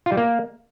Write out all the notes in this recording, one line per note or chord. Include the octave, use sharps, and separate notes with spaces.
F4
G3
A#3